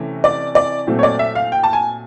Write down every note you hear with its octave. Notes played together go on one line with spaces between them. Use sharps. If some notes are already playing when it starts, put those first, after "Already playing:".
Already playing: C3 E3 A3 C#4
D5
D5
A#2 F#3 A3 C4
C#5
D5
E5
F5
G5
A5
G#5